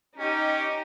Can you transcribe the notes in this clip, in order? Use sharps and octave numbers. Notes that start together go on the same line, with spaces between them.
C#4 D#4 G4